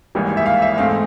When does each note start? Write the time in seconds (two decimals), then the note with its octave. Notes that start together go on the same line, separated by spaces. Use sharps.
0.15 G#1 G#2 E3 G3 A#3
0.37 E5
0.46 F5
0.62 E5
0.77 G#2 E3 A3 C4 F5